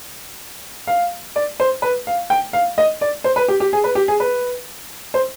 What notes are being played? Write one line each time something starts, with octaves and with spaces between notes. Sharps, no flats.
F5
D5
C5
B4
F5
G5
F5
D#5
D5
C5
B4
G4
G4
G#4
B4
G4
G#4
B4
C5